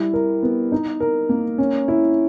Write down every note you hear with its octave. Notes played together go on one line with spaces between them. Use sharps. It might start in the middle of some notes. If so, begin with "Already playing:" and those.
Already playing: G3 E4
A#4
B3
D#4
A#4
A#3
C#4
E4